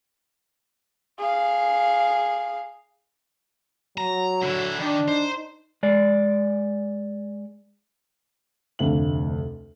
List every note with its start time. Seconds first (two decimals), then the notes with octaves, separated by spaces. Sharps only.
1.18 G#4 F5
3.98 F#3 A#5
4.43 D3 E4
4.79 D#3 D4
5.08 D#4 C5
5.83 G#3 D5
8.79 F1 D2 C3 F5 F#7